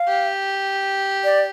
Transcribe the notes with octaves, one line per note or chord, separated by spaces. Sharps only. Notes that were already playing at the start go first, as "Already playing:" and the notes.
Already playing: F5
G4
D5